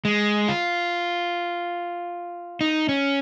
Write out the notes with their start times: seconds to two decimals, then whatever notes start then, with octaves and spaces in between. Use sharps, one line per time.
0.05 G#3
0.48 F4
2.61 D#4
2.89 C#4